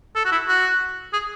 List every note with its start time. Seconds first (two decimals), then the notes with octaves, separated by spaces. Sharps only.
0.15 A4
0.25 F#4
0.32 E4
0.48 F#4
1.13 G#4